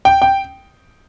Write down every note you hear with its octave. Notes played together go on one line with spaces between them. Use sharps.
G5
G5